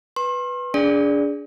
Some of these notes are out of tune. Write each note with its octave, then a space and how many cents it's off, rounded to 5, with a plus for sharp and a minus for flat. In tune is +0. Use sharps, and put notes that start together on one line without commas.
B4 +0 C6 +40
D4 -30 G#4 +0 D5 -5